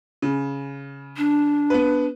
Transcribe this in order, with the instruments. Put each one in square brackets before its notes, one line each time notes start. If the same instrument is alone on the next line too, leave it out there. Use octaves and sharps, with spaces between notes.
[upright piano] C#3
[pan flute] D4
[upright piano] B3 B4